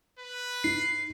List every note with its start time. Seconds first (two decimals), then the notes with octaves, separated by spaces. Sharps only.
0.19 B4
0.64 D#4 C7